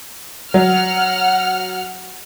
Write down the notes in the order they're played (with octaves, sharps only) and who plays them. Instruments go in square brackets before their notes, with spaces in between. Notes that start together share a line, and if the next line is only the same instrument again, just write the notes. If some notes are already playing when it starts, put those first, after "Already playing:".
[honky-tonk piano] F#3 [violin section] F#5 F6